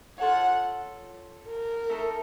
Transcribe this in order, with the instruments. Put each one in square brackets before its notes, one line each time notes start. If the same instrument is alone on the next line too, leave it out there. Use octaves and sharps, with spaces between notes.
[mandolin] F4 A4 C#5 [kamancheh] F#5
[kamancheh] A#4
[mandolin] A3 D#4 A4